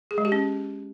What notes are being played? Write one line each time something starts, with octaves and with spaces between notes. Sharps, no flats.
G#4
G#3
G4
C#4